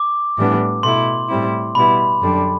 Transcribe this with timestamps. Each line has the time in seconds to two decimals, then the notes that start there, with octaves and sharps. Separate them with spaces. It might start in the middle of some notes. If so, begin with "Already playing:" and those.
Already playing: D6
0.37 A2 E3 G3 B3 D4
0.83 B2 A3 E4 C6
1.29 A2 G3 C4 E4
1.75 B2 G3 B3 E4 B5
2.21 F#2 D3 G3 D4